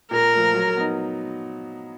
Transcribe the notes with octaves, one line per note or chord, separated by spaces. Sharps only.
A#2 A#4
F3 A3
F#3
B3 D#4